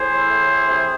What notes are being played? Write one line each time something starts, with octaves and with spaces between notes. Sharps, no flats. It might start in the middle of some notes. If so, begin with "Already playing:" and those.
Already playing: A2 G#4 C5
E3
A2
E3
C3